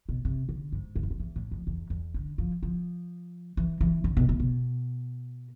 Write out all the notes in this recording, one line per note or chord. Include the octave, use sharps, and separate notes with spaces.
B2
C3
D3
G#2
F2
E2
F2
E2
A2
F2
E2
E2
D3
F3
F3
E3
E3
D3
B2
A2
B2